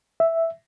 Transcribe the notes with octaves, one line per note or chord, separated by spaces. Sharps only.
E5